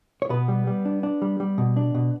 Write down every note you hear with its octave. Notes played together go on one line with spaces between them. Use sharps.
C#5
B2 B3 B4
G3
G3
D4
D4
G3
G3
B2
D4
B2